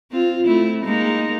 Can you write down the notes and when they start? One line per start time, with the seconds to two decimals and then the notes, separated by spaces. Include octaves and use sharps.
0.11 C4 F4
0.47 A3 C4 E4
0.84 G#3 A#3 D#4